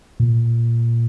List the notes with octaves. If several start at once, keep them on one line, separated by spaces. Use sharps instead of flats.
A#2